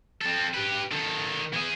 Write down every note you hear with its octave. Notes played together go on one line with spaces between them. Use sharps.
C4 A4
G4 B4
D#3 A4
E3 G#4